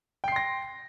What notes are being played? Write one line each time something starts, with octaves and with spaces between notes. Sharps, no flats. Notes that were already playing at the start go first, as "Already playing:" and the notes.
G5 C6 A#6 C7